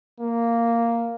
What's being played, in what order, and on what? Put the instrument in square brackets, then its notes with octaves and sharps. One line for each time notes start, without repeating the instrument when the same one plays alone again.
[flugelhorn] A#3